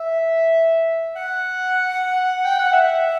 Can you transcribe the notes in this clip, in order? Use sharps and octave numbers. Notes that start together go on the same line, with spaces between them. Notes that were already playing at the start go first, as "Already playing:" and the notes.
Already playing: E5
F#5
G5
F#5
E5